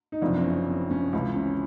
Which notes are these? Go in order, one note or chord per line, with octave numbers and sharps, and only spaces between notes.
D#4
F#1 F2 C3 D4
C4
C#4
C4
C#4
C#2 C3 E3
C#4